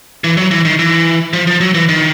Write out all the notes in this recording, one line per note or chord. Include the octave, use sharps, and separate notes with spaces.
E3
F#3
E3
D#3
E3
F3
F3
F#3
E3
D#3